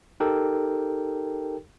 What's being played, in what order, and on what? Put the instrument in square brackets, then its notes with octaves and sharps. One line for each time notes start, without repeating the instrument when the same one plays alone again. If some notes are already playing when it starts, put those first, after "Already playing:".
[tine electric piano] D#4 G4 A4 A#4 G5